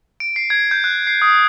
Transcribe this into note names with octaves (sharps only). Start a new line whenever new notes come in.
D7
C7
G#6
G6
F#6
C7
D#6